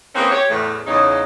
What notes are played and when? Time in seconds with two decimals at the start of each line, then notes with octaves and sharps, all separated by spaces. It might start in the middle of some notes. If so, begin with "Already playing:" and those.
0.15 E3 A#3 C4 C#4 G#4 A#4
0.31 G4 C#5
0.49 E2 A2
0.86 E2 C#3 D#4